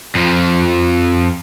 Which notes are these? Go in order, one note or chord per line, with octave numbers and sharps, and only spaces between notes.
F2 F3